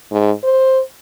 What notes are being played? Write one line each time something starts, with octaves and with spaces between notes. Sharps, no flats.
G#2
C5